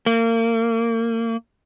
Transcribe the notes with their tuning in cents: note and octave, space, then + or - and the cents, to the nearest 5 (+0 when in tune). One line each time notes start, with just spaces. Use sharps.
A#3 -30